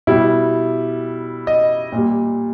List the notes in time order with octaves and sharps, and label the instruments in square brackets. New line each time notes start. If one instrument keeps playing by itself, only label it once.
[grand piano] B2 G3 E4
D#5
A#2
G3